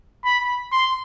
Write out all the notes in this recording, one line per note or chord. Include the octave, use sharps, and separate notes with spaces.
B5
C6